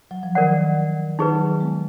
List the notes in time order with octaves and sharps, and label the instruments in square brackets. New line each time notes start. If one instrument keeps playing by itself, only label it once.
[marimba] F#3
F3
[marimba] D#3 [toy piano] A#4 D5 F#5
[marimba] D#3 F#3 [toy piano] D#4 G#4 B4
[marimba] G#3 B3